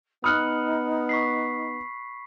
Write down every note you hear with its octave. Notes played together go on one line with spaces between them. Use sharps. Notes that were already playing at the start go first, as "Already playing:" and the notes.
B3 D#4 B5 D#6 F6 F#6 C#7 F#7
C#6 B6 C7